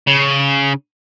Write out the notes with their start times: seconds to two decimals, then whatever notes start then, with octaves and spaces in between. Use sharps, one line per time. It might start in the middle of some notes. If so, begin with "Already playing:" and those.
0.08 C#3